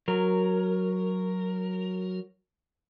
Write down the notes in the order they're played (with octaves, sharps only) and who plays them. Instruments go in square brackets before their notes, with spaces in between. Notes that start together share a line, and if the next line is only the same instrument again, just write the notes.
[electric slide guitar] F#3 A#4